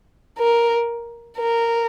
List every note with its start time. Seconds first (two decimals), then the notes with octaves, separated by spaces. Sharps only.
0.38 A#4
1.37 A#4